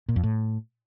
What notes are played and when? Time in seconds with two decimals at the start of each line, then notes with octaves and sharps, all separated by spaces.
0.09 A#2
0.16 F2
0.23 A2